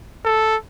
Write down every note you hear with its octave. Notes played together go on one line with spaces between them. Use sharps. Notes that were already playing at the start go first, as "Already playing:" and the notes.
A4